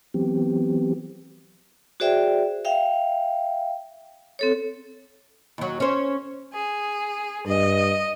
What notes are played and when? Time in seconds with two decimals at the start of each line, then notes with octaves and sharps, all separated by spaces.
0.14 E3 F#3 B3 C4 G4
2.00 F#4 G#4 C5 D5 E5 G5
2.65 E5 F5 G5
4.39 C4 A4 C#5
5.58 D#2 F#3
5.80 C#4 C5
6.53 G#4
7.46 G2 D#5